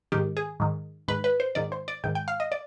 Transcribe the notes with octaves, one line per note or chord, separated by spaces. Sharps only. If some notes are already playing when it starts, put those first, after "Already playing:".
G#2 D#3 G4
G#4
G#2 D#3
G#2 D#3 B4
B4
C5
G#2 D#3 D5
C5
D5
G#2 D#3 G5
G5
F5
D#5
D5